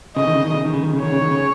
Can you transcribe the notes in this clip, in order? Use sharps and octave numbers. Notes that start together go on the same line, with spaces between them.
C#3 D#5
D#3
C#3
D#3
C#3
D#3
C#3
D#3
C#3
D#3 C#5
C#3
D#3
C#3